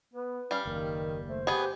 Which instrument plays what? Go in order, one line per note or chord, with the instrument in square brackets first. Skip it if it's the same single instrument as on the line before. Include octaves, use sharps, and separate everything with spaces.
[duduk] B3 [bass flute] B4
[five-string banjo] G3 F5 [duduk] C#4
[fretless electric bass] F#1 D#2 [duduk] D#3 [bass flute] A#4
[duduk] A3 [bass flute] C5
[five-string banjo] B3 G#4 [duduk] G4